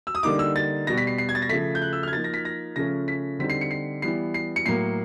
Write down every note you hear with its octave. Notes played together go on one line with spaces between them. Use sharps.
E6
D#6
D3 G3 A#3 D#4 D6
E6
A6
B2 G3 B3 A#6
B6
C7
C7
G#6
A6
A#6
C#3 F3 A3 B6
G6
F#6
E6
F6
G#6
F3 A#3 D#4 A6
A#6
B6
A#6
C#3 F3 A3 C#4 A#6
B6
D3 G3 C4 D#4 B6
C7
C#7
C7
E3 G3 B3 C7
C7
C#7
A2 F#3 A#3 C7